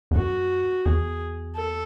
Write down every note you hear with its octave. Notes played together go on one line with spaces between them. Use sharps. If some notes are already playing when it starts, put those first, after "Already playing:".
E2
F#2 F#4
E2 G#4
A4